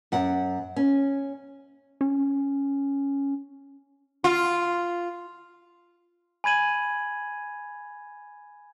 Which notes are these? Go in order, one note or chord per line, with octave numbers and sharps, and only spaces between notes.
F#2 F#5
C#4
C#4
F4
G#5 B5 G#6 D#7 F#7